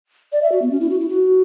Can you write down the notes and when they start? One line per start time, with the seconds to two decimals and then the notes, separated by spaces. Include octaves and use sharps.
0.32 D5
0.42 E5
0.52 F#4
0.62 B3
0.71 C#4
0.81 E4
0.90 F#4
1.00 E4
1.09 F#4